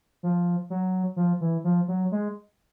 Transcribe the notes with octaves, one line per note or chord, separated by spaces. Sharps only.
F3
F#3
F3
E3
F3
F#3
G#3